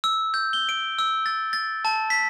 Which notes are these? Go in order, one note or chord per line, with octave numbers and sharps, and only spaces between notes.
E6
G6
G7
D7
E6
A6
A6
A5
B6